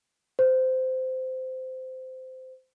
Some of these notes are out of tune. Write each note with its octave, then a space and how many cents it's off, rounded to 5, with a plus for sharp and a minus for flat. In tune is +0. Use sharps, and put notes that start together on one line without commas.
C5 -15